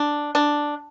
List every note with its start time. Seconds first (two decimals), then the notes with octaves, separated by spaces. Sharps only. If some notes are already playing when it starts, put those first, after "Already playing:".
Already playing: D4
0.35 D4